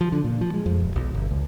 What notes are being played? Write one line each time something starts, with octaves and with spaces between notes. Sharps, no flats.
F3
D3
A#2
F3
G#3
F2
D#1
B1
G1
C#2